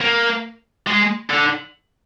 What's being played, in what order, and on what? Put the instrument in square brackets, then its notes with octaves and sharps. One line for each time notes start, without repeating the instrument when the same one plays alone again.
[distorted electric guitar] A#3
G#3
D3